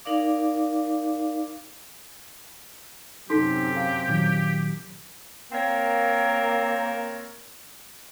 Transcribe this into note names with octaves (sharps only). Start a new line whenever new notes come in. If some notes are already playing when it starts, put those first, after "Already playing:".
D#4 A#4 D5 F5 D6
F#2 C3 D#4 G4 A4 C6 B6
F5
A#2 D#3 F#3
A#3 C4 A#4 C#5